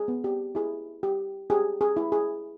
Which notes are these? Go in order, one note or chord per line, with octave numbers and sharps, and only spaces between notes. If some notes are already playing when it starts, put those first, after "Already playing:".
Already playing: G#4
B3
G4
E4 G#4
G4
G4 G#4
G#4
E4
G#4